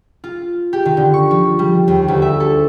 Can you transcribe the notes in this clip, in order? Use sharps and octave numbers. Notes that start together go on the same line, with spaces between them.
F4
G4
D#3
D3
C#6
F3
G3
D#2
D2
E5
A4